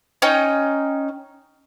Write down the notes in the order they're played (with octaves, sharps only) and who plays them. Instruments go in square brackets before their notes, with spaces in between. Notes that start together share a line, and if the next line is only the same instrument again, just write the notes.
[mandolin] C#4 D#4 G5